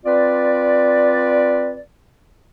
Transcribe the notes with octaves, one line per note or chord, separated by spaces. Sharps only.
C4 F4 B4 D5